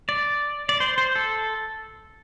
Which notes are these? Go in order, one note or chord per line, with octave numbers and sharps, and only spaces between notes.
D5
D5
C5
C5
A4